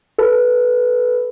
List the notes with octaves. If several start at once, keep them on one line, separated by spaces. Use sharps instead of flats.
A4 B4